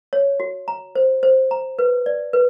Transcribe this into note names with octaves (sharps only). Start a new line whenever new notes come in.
C#5
F#4
A#5
C5
C5
A#5
B4
D5
B4